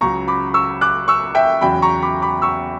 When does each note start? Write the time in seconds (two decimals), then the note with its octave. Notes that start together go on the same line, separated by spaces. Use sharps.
0.01 C#2 C#3 F#3 A#5 C#6
0.28 B5 D6
0.54 C#6 E6
0.81 D6 F#6
1.08 C#6 E6
1.35 E5 G5
1.61 E2 C#3 F#3 G5 B5
1.82 A#5 C#6
2.02 B5 D6
2.22 B5 D6
2.42 C#6 E6